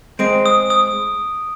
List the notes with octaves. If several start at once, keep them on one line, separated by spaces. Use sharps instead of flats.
G#3 C4 D7
D#6
D#6